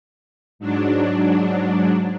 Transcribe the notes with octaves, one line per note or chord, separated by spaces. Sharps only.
G#2 F#3 D4